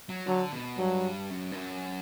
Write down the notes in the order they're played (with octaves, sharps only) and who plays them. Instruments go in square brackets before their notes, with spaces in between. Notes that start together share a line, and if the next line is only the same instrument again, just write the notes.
[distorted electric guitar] F#3
[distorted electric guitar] D3 [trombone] F#3
[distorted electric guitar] B2
[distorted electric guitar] G2 [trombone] F#3
[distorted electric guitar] F#2
G2
F#2